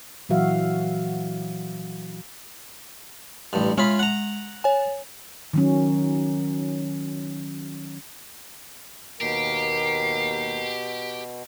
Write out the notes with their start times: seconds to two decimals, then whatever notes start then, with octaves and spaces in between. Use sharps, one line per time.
0.29 A#2 E3 F#3 F#4 E5 F5
3.53 A1 G2
3.78 G#3 C#4 F4 B5
3.99 F#5 A#5
4.64 C#5 G#5
5.53 D#3 F#3 C#4
9.21 D#2 B2 A#3 G4 A#4 C7